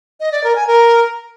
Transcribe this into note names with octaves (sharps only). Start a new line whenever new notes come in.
D#5
D5
A#4
G#5
A#4